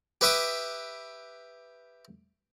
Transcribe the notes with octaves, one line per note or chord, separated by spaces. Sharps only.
G4 B4 E5 D6 D#6